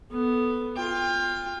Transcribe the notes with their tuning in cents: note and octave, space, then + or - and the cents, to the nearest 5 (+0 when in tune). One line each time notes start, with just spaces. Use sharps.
B3 +0 A4 -10
F4 +5 G5 +30